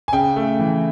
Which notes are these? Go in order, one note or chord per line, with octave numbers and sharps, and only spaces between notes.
G#5
C#3 G5
A3
E3